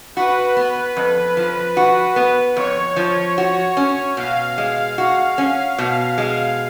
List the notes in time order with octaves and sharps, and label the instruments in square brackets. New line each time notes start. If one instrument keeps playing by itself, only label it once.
[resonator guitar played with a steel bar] F#4 [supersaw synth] B4
[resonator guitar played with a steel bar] B3
F2
F3
F#4
B3
[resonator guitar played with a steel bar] F2 [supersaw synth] C#5
[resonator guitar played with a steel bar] F3
F#4
C#4
[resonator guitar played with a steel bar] B2 [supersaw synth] F5
[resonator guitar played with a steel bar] G#3
F#4
C#4
[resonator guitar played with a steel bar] B2 [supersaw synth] F5
[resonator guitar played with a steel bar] G#3 [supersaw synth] F5